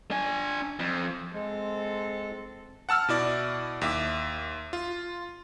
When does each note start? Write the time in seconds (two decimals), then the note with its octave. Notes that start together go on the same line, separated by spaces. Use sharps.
0.11 D4 G#5
0.79 F2
1.33 G#3 C4 A4
2.89 F#5 A5 E6 F6
3.08 B2 E4 D5
3.81 D#2 E5 D6
4.73 F4